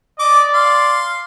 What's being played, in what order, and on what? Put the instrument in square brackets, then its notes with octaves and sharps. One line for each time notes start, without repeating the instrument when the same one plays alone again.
[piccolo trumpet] D5 [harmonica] D#5 D6
[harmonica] F5 C6